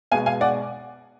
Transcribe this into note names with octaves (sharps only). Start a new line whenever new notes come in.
B2 G#3 B3 F5 G#5
F5 G#5
D5 F#5